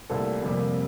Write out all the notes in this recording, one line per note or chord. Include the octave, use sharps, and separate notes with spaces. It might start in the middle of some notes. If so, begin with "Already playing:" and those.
C2 A#2 A3 A4
F2 C3 G3 A#3